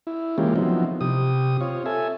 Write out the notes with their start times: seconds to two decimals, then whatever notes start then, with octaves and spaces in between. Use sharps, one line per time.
0.07 E4
0.38 E3 G#3 A#3 C#4 F4 G4
0.56 F3 F#3 B3 C4 D#4 E4
1.01 C3 G4 D#6
1.61 C4 F4 C#5
1.86 A4 E5 G#5